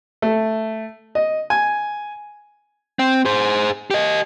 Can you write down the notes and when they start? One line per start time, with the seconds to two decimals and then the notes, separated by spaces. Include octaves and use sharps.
0.22 A3
1.15 D#5
1.50 G#5
2.99 C4
3.25 G#4 C5
3.91 G4 D#5